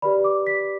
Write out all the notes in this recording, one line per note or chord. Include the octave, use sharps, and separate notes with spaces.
G4 B4 D5 B5
D6
B6